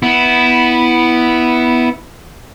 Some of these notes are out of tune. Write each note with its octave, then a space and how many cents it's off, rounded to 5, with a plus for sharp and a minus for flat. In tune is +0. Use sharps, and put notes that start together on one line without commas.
B3 +0 E4 -10